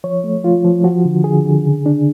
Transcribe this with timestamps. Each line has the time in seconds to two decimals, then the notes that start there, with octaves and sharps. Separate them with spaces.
0.04 F3 C#5
0.24 A3
0.44 F3 F4
0.64 F3
0.84 F3 F#4
1.05 D3
1.24 D3 G#4
1.45 D3
1.65 C#3
1.86 D4